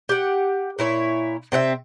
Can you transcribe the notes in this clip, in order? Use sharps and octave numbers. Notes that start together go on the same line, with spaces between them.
G4 F#5
A#2 E4 C#5
C3 C4 F#4 E5